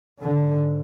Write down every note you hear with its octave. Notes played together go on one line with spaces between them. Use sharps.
G#2 D3